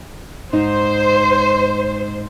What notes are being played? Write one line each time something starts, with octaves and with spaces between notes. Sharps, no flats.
G#2 D#4 C5